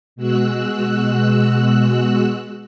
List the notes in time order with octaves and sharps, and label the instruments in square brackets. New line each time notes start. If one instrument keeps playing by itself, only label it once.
[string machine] B2 G#3 F#4 E6 F#6